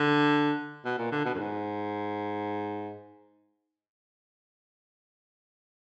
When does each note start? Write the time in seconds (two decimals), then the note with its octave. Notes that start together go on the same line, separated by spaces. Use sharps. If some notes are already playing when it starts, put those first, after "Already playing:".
Already playing: D3
0.85 B2
0.99 A#2
1.12 D3
1.25 B2
1.34 F#2
1.39 G#2